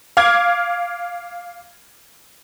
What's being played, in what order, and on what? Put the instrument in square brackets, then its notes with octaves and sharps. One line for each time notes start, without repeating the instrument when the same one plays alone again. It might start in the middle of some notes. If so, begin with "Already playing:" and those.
[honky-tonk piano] F5 D6 F6 G#6